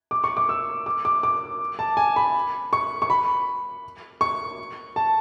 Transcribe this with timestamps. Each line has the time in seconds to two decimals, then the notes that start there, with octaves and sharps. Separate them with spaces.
0.11 D6
0.24 C#6
0.37 D6
0.49 E6
0.86 D6
1.05 D6
1.23 D6
1.79 A5
1.97 G#5
2.16 B5
2.73 C#6
3.02 C#6
3.10 B5
4.21 C#6
4.96 A5